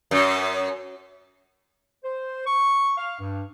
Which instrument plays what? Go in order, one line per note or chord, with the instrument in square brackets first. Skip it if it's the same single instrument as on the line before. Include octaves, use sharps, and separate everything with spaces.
[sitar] F#2
[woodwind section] C5
C#6
F5
G2